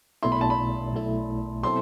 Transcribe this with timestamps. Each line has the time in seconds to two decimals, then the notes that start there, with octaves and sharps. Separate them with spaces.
0.23 B1 B2 A3 E4 C6
0.32 B5
0.41 A5
0.50 B5
0.93 B1 B2 A3 E4
1.63 B2 F#3 C4 E4 A4 C6